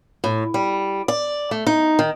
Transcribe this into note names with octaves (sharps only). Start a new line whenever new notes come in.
A2
G3
D5
A3
D#4
D#3